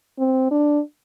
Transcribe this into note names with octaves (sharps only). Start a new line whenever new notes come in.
C4
D4